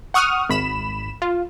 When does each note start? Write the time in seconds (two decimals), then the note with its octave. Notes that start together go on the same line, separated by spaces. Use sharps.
0.14 F#5 C#6 D#6 F6
0.49 G#1 B5 E7
1.22 F4